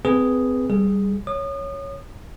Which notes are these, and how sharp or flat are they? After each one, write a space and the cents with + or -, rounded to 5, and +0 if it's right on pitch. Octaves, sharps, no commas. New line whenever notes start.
C4 -30 G#4 +0 B4 +0
G3 +0 G#4 +0
C#5 +0 D#6 -35